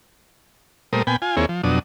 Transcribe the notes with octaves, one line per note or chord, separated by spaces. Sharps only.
A#2 G3 A3 A#4 C5 D#6
A#2 B3 G5 G#5 B5
F4 G#5
D#2 A#3 C4 E4 G#4 C#5
F3
F2 B2 F#3 D4 D#6